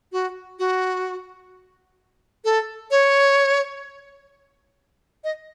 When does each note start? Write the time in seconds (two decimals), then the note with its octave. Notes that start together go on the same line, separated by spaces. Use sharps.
0.12 F#4
0.59 F#4
2.45 A4
2.91 C#5
5.24 D#5